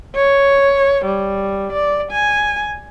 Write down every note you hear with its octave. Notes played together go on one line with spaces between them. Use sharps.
C#5
G3
D5
G#5